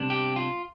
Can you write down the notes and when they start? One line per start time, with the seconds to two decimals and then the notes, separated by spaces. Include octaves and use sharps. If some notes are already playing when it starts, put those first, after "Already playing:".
Already playing: C3 G3 B3 D4
0.10 G4
0.36 F4